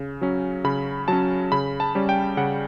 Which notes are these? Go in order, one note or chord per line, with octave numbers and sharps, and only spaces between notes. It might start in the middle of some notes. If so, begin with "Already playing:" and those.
Already playing: C#3
F#3 C#4
C#3 B5
F#3 C#4 A5
C#3 B5
A5
G3 C#4
G5
C#3 F#5